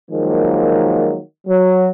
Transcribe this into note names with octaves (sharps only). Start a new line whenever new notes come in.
D#3 F3 F#3 G#3 A#3
F#3